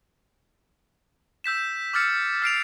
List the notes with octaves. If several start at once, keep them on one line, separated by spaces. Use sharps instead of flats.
E6 G6 B6 E7
D6 E6 F6 A6 C#7
F6 C7 D7 F7